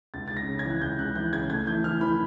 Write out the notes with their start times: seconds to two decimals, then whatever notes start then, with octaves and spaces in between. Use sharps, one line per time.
0.14 C#2 A6
0.28 C#3 A6
0.37 A#6
0.48 C#3
0.59 G#6
0.65 E3
0.70 F#6
0.82 C#2 G6
0.99 C#3 F#6
1.16 E3 G6
1.33 C#3 G#6
1.50 A3 G#6
1.67 E3 G6
1.84 E3 F6
2.01 E3 B5